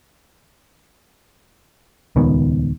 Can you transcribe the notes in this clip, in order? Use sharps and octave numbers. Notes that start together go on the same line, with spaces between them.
D#1 C#2 D#3 B3